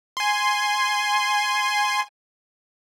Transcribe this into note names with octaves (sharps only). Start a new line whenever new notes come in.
G#5 C6